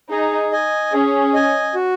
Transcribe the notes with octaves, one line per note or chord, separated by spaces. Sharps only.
D#4 G#4
D#5 G#5
C#4 G#4
D#5 G#5
F#4